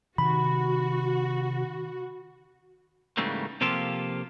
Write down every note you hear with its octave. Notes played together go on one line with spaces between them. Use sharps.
C3 D#3 F#4 B5
G#2 C#3 E3 G3 A3 A#3
C3 F3 A#3 F4 G4 A4